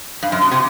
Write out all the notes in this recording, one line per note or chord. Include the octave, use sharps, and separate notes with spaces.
G2
F#2
B2
C3